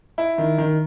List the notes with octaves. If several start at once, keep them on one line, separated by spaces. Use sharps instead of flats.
E4
D#3
D#3